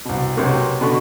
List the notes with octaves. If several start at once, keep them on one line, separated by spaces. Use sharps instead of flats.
C2 B2
B1 C3 A#3
B2 D3 C#6